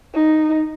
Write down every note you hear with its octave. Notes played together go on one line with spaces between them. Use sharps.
D#4